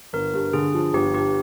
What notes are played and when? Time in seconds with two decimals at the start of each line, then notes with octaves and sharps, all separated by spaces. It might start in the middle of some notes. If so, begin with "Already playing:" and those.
0.13 G1 A#4
0.34 G2
0.53 D3 G#4
0.74 F3
0.93 G1 G4
1.14 G2 G4